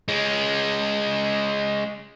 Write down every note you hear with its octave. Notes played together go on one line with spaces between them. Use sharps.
G#3 C#4